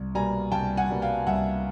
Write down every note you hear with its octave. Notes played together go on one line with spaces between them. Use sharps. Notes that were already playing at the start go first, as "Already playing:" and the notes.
Already playing: C2
B2 G3 A#3 G#5 A#5
C2 G5 A5
F#5 G#5
B2 G3 A#3
F5 G5
C2 E5 F#5